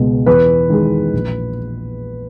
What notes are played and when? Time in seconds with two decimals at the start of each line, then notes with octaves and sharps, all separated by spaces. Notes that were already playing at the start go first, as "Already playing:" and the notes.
Already playing: C#2 B2 G#3
0.26 E2 B4
0.69 D#3 G#3
1.13 A#1